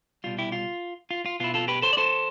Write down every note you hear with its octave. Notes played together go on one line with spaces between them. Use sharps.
C2 B2 G3 F4
E4 G4
F4
F4
F4
B2 B3 E4 F4
F4 A4
G4 B4
A4 C5
D5
A4 C5